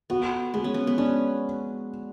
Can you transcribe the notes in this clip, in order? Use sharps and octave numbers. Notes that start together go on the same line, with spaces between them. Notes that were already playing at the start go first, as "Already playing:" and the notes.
B3 F#4
G#3 B3
C#4
B3
B3
C#4 D4